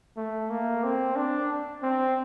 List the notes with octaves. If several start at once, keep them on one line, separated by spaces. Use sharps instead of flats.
A3
A#3
C4
D4
C4